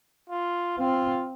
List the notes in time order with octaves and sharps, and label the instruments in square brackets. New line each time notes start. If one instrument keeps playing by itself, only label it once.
[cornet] F4
[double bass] C4 [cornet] F4